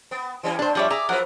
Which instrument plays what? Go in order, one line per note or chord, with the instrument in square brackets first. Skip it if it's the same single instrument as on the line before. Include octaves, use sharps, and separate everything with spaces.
[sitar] B3
E3 G3 C#4
[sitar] G2 [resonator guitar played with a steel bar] D4 C5
[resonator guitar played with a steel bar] F3 G3 C#5 [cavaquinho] G#4 D5 E5
[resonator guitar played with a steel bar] G#4 E5 A#5 [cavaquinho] D5
[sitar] F3 F#3 B4 [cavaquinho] A#4 F#5